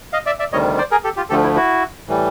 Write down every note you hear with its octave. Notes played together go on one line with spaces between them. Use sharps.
D#5 F5
D5 E5
D5 E5
D2 C3 D#3 G3 C#5 D#5
C5 D5
G#4 A#4
G4 A4
F4 G4
D2 D3 F3 A3 G4 A4
E4
E4 F#4
A2 E3 G3